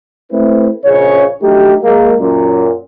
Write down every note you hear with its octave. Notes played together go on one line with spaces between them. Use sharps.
A3 C4 E4 B4
A#1 C#3 C#5
F#3 A3 D4 D#4 F#4 G4
G#3 A#3
F#2 A#2